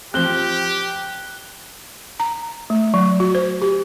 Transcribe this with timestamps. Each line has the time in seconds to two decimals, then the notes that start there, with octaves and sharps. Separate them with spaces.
0.14 F3 C4 G4 F#6 G7
2.20 A#5
2.70 A3
2.94 F#3
3.20 F#4
3.35 C5
3.62 G4